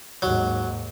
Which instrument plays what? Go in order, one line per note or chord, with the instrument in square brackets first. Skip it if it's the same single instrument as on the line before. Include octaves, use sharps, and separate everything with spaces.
[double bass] D#2 G#2 [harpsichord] F#3